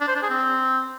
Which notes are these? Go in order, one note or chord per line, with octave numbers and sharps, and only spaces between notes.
D4
C5
D4
G#4
C4